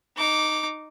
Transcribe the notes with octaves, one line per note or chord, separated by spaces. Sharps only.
D#4 D6